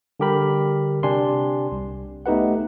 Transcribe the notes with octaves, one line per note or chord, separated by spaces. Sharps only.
D3 G3 G4 A#4 B5
C3 D4 G4 G#5 C6
C2
A3 B3 D#4 G4 B4 F#5